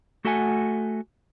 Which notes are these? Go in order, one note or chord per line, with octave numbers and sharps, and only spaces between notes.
A3 F#4 A4 E5 F#5 G#5